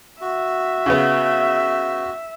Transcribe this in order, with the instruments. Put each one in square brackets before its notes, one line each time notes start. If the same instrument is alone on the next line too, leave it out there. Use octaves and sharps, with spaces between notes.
[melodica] F#4 [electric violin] E5
[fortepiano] C#3 B3